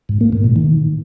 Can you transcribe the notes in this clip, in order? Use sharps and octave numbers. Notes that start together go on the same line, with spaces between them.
G#2
A#3
G#2
A#2
D#3